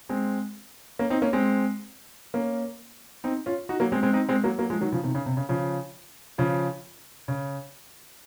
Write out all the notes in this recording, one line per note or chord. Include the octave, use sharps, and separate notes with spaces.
G#3 C4
A#3 C#4
C4 D#4
A#3 C#4
G#3 C4
A#3 C#4
C4 D#4
C#4 F4
D#4 F#4
F#3 A#3
G#3 C4
G#3 C4
C4 D#4
G#3 C4
F#3 A#3
F#3 A#3
F3 G#3
D#3 F#3
C#3 F3
C3 D#3
C#3
C3
C#3
C#3 F3
C#3 F3
C#3